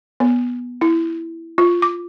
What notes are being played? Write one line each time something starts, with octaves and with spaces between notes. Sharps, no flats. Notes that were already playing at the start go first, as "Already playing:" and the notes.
B3
E4
F4
D6